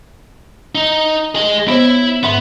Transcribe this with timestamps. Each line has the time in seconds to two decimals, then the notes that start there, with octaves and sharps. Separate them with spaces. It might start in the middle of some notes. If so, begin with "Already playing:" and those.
0.75 D#4
1.35 G#4 D#5
1.68 B3 E4 C5 C#5 E5
2.23 G#2 B3 E5 B5